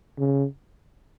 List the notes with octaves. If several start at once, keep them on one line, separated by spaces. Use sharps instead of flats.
C#3